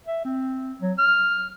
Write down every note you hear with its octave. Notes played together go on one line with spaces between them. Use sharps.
E5
C4
F#3
F6